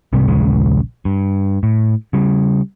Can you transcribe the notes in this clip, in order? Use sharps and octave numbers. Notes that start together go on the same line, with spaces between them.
C2 G#2 C3 G3
A#1 D#2 C#3 G#3
G2
A2
C#3 G3